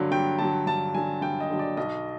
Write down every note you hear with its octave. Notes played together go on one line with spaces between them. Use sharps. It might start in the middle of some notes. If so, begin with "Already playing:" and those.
Already playing: G2 D3 F#3
G2 G5
D3 F#3 A5
G2 A5
D3 F#3 G#5
G2 G5
D#5
D3 F#3
D5
B1 D#5